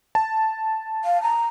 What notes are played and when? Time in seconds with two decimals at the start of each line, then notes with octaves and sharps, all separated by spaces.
0.15 A5
1.05 F5
1.23 A#5